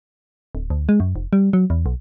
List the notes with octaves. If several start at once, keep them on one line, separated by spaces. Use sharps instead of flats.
D1
D2
G#3
F#2
F1
G3
F#3
E2
B1